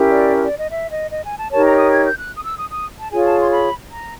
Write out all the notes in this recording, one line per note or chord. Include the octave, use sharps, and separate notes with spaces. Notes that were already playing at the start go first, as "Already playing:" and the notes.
Already playing: C#4 E4 G4 A#4
D5
D5
D#5
E5
D#5
D#5
G#5
A5
D#4 G4 A#4 C#5 A5
A#5
D#6
G#6
G6
F#6
D#6
E6
D#6
D#6
A5
F4 G#4 C#5 G#5
A5
C6
B5
A#5